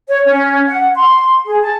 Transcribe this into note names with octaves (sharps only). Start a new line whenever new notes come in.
C#5
C#4
F#5
C6
G#4
A5